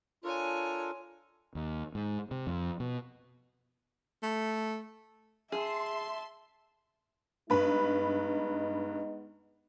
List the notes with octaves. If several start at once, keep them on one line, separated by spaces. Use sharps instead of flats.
D4 F4 A4 A#4 C#5 G#5
D#2
G#2
C3
F2
B2
A3
G#4 E5 A5 C6
G2 G#3 B3 D#4 B4 B5